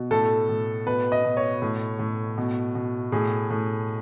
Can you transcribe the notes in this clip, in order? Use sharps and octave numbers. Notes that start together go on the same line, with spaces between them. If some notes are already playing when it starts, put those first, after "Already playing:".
Already playing: B2
A2 A4
A2
B2 B4
D#5
B2
C#5
A2
A2
B2
B2
A2 G#4
A2